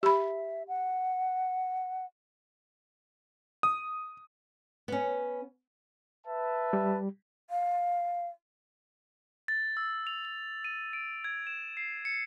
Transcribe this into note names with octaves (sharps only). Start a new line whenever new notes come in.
G4 E5 B5
F#5
D#6
B3 C#4
B4 E5 A5
G3
F5
A6
E6
F7
F7
D#7
D7
G#6
E7
C7
C#7